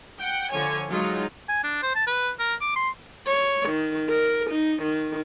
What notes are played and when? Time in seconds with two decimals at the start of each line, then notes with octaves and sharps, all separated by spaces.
0.20 F#5 G5
0.50 D3 F3 C#5 G#5
0.90 F#3 G#3 D#4 F4
1.49 G#5
1.64 D4
1.82 C5
1.95 A5
2.07 B4
2.39 A#4
2.61 D6
2.76 C6
3.27 C#5
3.70 D#3
4.11 A#4
4.50 D#4
4.82 D#3